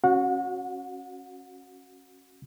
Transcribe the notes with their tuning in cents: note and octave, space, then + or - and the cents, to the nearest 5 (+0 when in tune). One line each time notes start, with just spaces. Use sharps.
C#4 -20 F#4 +0 F#5 -35